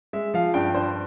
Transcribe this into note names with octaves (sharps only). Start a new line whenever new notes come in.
G#3 E5
F3 F5
G2 G5
G2 C5